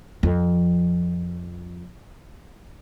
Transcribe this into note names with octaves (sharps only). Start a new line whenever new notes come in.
F2 F3